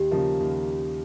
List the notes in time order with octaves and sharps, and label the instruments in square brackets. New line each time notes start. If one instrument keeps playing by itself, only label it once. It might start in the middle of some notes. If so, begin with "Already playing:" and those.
Already playing: [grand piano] D#2 [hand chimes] G4
[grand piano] C#3 F3 A#3 D#4
D#2